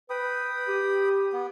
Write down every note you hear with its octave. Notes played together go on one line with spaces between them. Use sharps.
B4 G5 B5 D#6
G4
B3